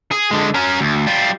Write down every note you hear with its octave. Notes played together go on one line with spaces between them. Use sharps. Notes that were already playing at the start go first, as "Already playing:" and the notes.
G#4
D3 G#3
C#4 A#4
D2
G3 F4